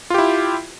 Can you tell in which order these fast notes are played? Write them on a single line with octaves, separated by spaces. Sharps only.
F4 G4 E4